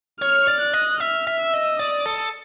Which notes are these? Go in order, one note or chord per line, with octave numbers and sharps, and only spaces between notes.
C#5 F6
D5
F#6
D#5
E5 F6
E5
E6
D#5
D5 D#6
A4